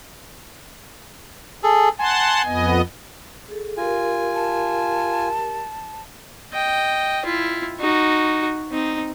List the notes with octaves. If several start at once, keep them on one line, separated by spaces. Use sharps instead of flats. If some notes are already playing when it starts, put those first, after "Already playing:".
G#4 A4
F#5 G#5 A5 C6
F2 B3 D#5
G#4 A4
F4 G4 A#4 G#5
A5
D#5 G5
E4 F4
D#4 F#4
C4 D#4